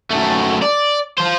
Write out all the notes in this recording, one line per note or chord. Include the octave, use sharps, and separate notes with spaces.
F#2 A3
D5
F4 C5